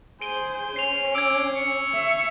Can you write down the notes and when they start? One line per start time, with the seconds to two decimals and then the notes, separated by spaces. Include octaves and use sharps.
0.21 G#4 C5 D7 D#7 G7
0.76 C#4 C7 F7
1.15 D6 E6 G#6
1.56 C#6
1.94 E5